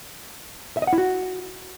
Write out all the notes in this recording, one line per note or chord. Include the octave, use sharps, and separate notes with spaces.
E5
D#5
F#5
E4
F#4